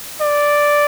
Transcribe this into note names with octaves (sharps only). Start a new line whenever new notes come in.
D5